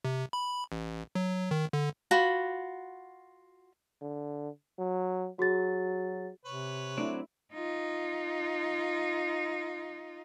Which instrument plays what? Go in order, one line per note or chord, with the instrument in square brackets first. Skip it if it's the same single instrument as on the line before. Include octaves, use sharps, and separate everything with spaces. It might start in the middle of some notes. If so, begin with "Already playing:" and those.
[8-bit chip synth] C3
B5
A1
F#3
D#3
D3
[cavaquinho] F4 F#4 B5
[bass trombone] D3
F#3
[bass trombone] F#3 [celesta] F#4 G#4 A6
[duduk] C3 [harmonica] B4 C#5
[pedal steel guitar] F#3 C4 D5 [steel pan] A3 D4 E4
[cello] D#4 F4